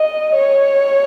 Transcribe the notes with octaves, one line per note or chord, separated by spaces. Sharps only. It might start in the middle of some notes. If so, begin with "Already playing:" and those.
Already playing: D#5
C#5